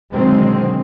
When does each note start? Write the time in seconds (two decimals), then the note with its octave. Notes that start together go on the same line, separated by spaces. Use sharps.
0.14 B2 D3 D#3 F#3 G#3 C4